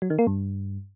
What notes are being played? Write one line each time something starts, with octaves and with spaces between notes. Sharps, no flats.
F#3
D#3
A#3
G2